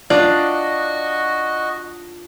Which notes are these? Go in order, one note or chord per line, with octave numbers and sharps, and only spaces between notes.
D4 F4 F#4 D5 D#5